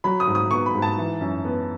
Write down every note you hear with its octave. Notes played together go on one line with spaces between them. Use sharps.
F#3 B5
D#6
G#2
D#6
B3 C#6
B5
G#2
A5
E3
F#2
B3